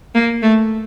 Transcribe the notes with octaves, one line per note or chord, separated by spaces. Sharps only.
A#3
A3